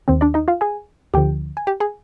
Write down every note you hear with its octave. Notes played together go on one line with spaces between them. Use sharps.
D#2 D#3 C4 C5
D4 D5
D#4 D#5
F4 F5
G#4 G#5
D2 D3 F3 G4 G5
G#5
G4 G5
G#4 G#5